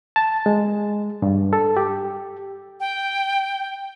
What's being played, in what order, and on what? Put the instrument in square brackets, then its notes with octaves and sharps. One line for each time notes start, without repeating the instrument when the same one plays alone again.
[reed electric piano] A5
G#3
G2
A4
G4
[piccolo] G5